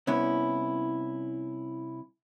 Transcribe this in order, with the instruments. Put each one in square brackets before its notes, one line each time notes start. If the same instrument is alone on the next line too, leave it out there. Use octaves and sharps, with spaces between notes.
[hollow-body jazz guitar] C2 B3 C#4 E4